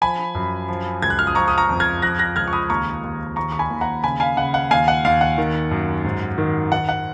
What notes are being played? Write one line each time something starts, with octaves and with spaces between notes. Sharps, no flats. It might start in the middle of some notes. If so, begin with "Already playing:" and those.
F3 G#5 B5
F#2
F3
C#2 G#6
F#6
F6
D#6
F3 A#5 C#6
D#6
A#5 C#6
F2
F6 G#6
F3 F#6 A#6
F#6 A#6
C#2 F6 G#6
C#6
B5 D#6
D#2 A#5 C#6
D#2
D#2 A#5 C#6
C#6
G#5 B5
D#2
F#5 A#5
C#3 G#5 B5
F5 G#5
C#3 F#5
F#5
D#2 F5 G#5
F#5
D#2 F5
F#5
D#3
F#2
G#2
D#3
D#3 F#5
F#5